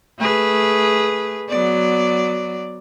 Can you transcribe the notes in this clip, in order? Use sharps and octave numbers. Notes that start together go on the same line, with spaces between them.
A3 G#4 B4
F#3 B3 D5